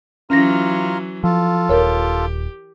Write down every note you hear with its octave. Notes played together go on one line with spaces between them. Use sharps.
E3 F#3 C#4 F4 A#5 F6 A#6
F3 F4 A4
D#1 G4 A#4 C#5